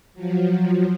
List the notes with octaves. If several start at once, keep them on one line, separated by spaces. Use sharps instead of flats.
F3 F#3